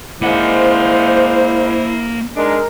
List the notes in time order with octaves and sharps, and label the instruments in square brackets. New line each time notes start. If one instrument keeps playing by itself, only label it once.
[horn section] G#3 D5 F5 [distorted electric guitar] A#3 F#5 [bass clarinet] E4 [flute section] C5
[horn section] G#3 D4 D#4 [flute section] A#4